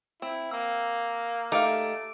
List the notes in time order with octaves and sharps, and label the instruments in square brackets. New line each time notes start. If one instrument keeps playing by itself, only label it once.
[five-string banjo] C4 [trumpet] E4
[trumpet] A#3 [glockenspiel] E6
[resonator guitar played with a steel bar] A3 [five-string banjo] D#4 G4 F5 [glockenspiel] D6 D7